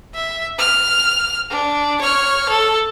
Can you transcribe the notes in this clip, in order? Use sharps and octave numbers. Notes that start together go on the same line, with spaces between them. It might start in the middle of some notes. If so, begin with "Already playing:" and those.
E5
F6
D4
C#5 F6
A4